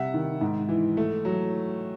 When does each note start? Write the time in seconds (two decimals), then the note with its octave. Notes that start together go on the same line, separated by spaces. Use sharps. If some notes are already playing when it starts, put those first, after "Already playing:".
Already playing: C3 G3 E5 F#5
0.14 D#3
0.41 G#2
0.69 E3
0.97 A3
1.25 F#3